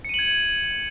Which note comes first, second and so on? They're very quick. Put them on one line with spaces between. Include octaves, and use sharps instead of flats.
C#7 D#7 F#7 G#6